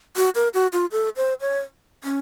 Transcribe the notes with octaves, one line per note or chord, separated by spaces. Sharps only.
F#4
A#4
F#4
F4
A4
C5
C#5
C#4